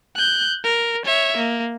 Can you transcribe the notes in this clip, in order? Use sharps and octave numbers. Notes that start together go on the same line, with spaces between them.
F#6 G6
A#4
C#5 E5
A#3